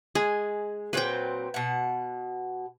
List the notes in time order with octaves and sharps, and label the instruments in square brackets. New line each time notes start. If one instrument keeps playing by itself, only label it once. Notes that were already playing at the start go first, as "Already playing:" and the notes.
[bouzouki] G#3 [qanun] G#4
[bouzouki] A#2 F#3 C4 [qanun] B4 G5
[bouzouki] B2 F#5